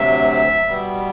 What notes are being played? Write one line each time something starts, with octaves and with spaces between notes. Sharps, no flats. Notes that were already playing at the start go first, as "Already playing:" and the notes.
Already playing: D2 C3 F#3 E5
B2 G3 B3